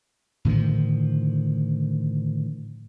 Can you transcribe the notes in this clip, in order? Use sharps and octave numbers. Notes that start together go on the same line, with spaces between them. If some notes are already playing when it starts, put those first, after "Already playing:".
A2 D3 D#3 F3